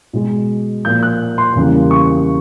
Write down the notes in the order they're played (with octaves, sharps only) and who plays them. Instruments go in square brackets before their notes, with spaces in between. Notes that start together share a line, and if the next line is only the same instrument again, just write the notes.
[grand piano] B2 G#3
A#2 F3 A#3 G6
F#6
C6
E2 C#3 E3 G3 A#3
C#6